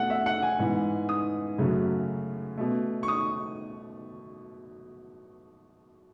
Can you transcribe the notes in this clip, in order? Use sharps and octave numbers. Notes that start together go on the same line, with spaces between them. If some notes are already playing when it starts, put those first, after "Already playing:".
Already playing: B2 A3 F#5
E5
F#5
G#5
G#2 E3 B3
D#6
F#2 C#3 F#3 A3
B2 A3
C#6
D#6